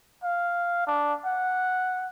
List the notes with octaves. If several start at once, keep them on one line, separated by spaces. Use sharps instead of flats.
F5
D4
F#5